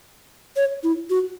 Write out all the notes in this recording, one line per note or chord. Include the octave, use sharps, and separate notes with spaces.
C#5
E4
F#4